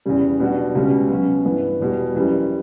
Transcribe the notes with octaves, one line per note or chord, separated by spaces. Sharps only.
E2 C#3 G3
B2 G3 D4 F#4
C#2 B2 G3 C#4
B2 F#3 C#4
G2 E3 B3
E2 B2 G3
F#2 E3 G3